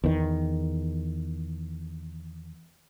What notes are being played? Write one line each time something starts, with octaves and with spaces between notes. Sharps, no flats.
E2 D#3